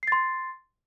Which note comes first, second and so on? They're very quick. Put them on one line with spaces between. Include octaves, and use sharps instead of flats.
C7 A6 C6